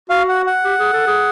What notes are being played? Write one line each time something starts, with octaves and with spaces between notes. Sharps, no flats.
F#4 F5
F#5
F#5
G4
G#4
A4
G#4